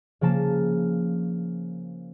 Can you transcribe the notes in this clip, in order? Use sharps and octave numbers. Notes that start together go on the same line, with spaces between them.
C#3 F3 A#3 A5